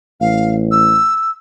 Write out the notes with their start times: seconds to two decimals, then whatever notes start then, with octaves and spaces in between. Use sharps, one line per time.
0.21 A1 F5
0.71 E6